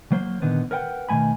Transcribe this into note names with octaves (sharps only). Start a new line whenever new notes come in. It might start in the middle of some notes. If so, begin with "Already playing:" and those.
F#3 A#3 C5
A#2 D3 D#3 B3
A#4 B4 F#5 G5
B2 D#3 A3 G#5 B5